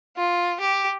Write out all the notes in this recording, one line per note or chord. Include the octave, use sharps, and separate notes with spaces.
F4
G4